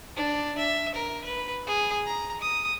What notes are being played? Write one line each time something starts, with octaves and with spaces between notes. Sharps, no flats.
D4
E5
A#4
B4
G#4
A#5
D#6